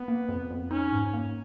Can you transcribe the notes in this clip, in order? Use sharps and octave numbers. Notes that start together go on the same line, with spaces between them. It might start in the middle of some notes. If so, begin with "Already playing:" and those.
Already playing: B3
A#3
F2
F2
C#4 D#4
G#2
A#3